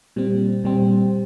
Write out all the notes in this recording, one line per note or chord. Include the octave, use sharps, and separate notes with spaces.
A#2 G3 C4
A#2 G3 C4